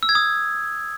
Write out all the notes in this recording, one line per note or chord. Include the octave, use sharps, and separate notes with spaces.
E6
G#6
D#6